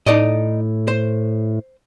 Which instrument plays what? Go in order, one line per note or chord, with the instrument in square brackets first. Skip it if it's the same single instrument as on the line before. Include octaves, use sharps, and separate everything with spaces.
[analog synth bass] A2 [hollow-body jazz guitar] D#4 D5 D#5
[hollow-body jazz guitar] C5